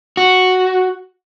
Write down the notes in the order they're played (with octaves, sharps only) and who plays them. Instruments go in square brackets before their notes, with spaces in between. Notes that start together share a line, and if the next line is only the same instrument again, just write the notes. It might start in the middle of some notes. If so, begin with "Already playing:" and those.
[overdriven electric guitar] F#4